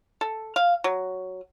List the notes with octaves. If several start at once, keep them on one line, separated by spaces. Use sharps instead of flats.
A4
F5
F#3